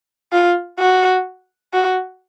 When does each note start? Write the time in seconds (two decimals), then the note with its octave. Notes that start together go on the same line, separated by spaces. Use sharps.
0.33 F4
0.79 F#4
1.74 F#4